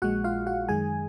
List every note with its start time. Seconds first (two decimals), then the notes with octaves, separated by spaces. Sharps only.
0.02 A#1 A#2 G#3 F#4 F#5
0.24 F4 F5
0.47 F#4 F#5
0.69 F#2 D#3 G#3 G#4 G#5